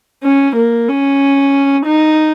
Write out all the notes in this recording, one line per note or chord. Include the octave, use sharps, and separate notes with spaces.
C#4
A#3
C#4
D#4